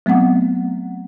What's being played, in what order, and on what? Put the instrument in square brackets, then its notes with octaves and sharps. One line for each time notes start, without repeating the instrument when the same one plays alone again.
[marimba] F#3 A3 B3 C4 F#5